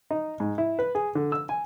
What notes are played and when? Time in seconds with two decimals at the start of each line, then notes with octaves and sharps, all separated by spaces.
0.11 D#4
0.40 G#2
0.58 E4
0.79 B4
0.95 G#4
1.15 D3
1.32 E6
1.49 G#5